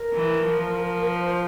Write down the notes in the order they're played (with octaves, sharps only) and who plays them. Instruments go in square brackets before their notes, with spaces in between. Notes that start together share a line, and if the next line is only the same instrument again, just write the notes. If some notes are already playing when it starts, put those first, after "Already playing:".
Already playing: [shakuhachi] A#4
[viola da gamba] E3
F3
[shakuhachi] C5